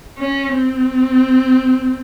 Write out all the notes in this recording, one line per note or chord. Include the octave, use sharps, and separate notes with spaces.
C#4
C4